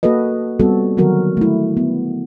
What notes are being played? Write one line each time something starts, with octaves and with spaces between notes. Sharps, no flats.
A#3 F#4 A4 B4 D#5
G3 B3 C4 F#4 A4
D3 D#3 F#3 F#4 A#4
A3 E4
B3